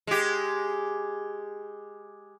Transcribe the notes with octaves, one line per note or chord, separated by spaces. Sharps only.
G#3 G4